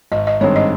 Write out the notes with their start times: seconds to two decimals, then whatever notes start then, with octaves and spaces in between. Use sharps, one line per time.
0.12 G#1 D#5
0.27 D#5
0.41 G2 D#3 G#3 C4 C#5
0.56 D#5